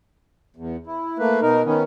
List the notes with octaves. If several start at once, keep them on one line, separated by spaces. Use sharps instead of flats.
E2
E4
A3 A#3 B4
B2 D#4 A#4
D#3 B3 C#4